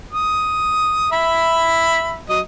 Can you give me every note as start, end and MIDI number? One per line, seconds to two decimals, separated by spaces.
0.13 1.08 87
1.12 2.20 76
1.12 2.20 83
2.30 2.40 54
2.30 2.40 75